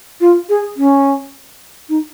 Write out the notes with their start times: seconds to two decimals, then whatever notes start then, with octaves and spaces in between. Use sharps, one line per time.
0.20 F4
0.49 G#4
0.77 C#4
1.89 D#4